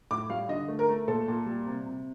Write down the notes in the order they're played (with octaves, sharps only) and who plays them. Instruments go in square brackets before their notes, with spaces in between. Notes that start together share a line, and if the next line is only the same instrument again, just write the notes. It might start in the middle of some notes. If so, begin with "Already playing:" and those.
[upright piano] A2 D6
G3 F5
D3 D#5
A3
A#4
A3
A#2 A4
A#2
G3
C3
C3